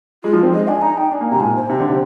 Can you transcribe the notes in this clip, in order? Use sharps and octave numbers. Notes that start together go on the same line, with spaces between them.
G#3 F4
F3
C4
G#3 D#5
D4 G#5
D#4 A#5
D#4 G5
D4 G#5
A#3
C3 A#5
G#2
A#2 G#5
C5
C3
D3
C3